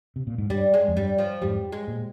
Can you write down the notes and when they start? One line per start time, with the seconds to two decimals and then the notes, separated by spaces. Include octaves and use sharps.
0.16 C3
0.27 A#2
0.38 G#2
0.50 G2 G3
0.74 G#3
0.88 F2
0.96 G2 G3
1.18 F3
1.41 F2 G#2 G3
1.72 G#3
1.88 A#2